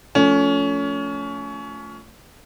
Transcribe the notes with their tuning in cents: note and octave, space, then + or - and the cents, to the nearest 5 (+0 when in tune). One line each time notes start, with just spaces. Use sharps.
F3 +0 A3 +0 C#4 +25